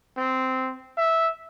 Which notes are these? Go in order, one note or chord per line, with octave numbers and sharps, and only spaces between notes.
C4
E5